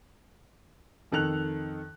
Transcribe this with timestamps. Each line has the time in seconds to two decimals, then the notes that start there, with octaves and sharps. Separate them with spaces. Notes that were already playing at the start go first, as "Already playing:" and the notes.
1.12 F2 D#3 A4 F#6 F7